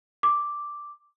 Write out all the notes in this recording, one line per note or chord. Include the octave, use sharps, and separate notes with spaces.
D6